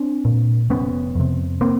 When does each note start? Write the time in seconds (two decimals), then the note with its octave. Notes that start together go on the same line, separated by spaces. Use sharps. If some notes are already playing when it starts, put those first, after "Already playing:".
Already playing: C4 D4
0.25 A#2
0.70 F1 B3 C#4
1.15 F2 C3
1.61 A#3 C4